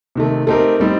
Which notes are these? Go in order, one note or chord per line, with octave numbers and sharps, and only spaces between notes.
C3 D#3 A3
A3 C4 D#4 G4 A#4
A2 G3 C4 D#4